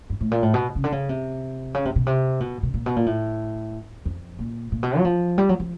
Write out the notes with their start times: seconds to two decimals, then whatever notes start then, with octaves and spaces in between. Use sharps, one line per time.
0.10 G2
0.21 A2
0.31 A#2
0.43 A2
0.54 B2
0.76 C#3
0.84 D3
0.92 C#3
1.09 C3
1.74 C#3
1.85 C3
1.96 B2
2.07 C3
2.40 B2
2.63 B2
2.74 A#2
2.86 B2
2.96 A#2
3.06 A2
4.05 F2
4.39 A#2
4.72 A#2
4.83 B2
4.98 F#3
5.05 F3
5.38 G3
5.49 F#3
5.60 F3